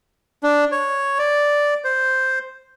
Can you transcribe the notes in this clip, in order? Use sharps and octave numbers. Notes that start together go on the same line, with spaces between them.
D4
C#5
D5
C5